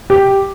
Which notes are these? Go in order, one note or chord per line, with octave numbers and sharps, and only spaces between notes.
G4